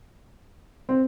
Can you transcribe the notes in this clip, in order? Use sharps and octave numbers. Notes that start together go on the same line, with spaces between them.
C4